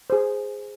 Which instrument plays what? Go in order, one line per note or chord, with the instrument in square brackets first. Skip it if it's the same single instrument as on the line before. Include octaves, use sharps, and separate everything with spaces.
[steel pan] G#4 C5